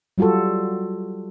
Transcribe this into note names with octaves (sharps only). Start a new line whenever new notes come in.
F#3 G3 F4 F#4 A4